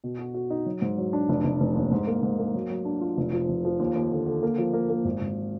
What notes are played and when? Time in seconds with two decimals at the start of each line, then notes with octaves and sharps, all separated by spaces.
0.04 B2
0.19 F#4
0.34 F#4
0.50 D#4
0.66 F#3
0.82 G#2
0.98 F#3
1.13 D4
1.29 F1
1.44 F1
1.60 F1
1.75 D#2
1.91 G#2
2.07 A#3
2.23 G#2
2.39 A#3
2.54 F#3
2.70 F#3
2.85 D4
3.01 F4
3.17 F1
3.33 F3
3.48 F1
3.65 F3
3.79 D#2
3.95 D#2
4.11 D3
4.27 D3
4.43 A#3
4.58 F3
4.73 A#3
4.90 A#3
5.05 G#1
5.21 G#1